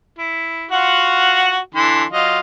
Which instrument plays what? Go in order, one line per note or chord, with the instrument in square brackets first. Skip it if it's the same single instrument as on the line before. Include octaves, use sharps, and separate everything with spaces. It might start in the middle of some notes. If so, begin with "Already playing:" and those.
[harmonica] E4
F4 F#4 F#5
D3 E3 C6
F#3 F4 D#5